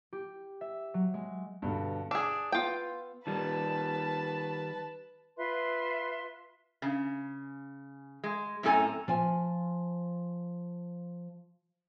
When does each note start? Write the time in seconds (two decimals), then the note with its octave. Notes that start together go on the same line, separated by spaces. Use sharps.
0.12 G4
0.61 E5
0.94 F#3
1.14 G#3
1.62 G2 B2 D3
2.11 D4 G#4 E6
2.52 B3 F4 G5
3.27 D#3 G3 B4 A5
5.37 F4 B4 E5 C6
6.82 C#3
8.24 G#3
8.63 F#2 A2 C4 A4 G#5 A#5
9.08 F3 G#5